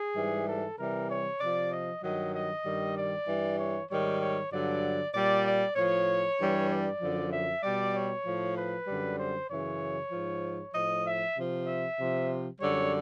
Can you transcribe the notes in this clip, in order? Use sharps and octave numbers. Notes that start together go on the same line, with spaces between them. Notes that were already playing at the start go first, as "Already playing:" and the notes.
Already playing: G#4
G#2 E3 G3
A4
C3 E3 G3 A#4
C#5
C3 F3 D5
D#5
G2 D#3 F#3 D#5
D#5
G2 D#3 G3
D5
G2 E3 G3
C#5
G#2 D#3 G3 C#5
C#5
G2 D3 F#3 D5
A#2 G3 D5
D5
A2 F3 C#5
G2 E3 G3
D5
F#2 D3 F3
E5
B2 G3 D5
C#5
A2 F3
B4
F#2 D3 G3
C5
F#2 C#3 E3 C#5
G#2 F3
A2 F3 D#5
E5
C3 F3
E5
C3 F3
F#2 D3 G3 C#5